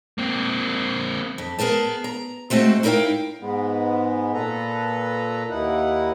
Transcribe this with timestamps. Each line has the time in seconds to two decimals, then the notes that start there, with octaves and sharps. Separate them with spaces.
0.18 A#3 C4
1.38 F2
1.59 B3 G#4 A#4 B4 A5
2.04 A#5
2.50 G#3 A3 C4 F#4 C5
2.83 D#4 E4 A#4 C5 F5 G5
3.42 G#2 G#3 B3
4.34 A#2 A4 B4 A#5
5.50 D#2 D#4 E4 F#5